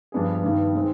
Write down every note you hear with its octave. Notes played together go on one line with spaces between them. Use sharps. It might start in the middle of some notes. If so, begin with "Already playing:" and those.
G2 F3 B3 D4 G#4
G2 D#3 B3
D#3 G#3 C4